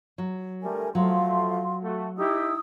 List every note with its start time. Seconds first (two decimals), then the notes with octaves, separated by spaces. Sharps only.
0.18 F#3
0.63 D3 G3 A3 A#4 G#5
0.95 F3 F#3 A3 F5 C6
1.84 A3 F#4
2.18 D#4 E4 G4 D#6 E6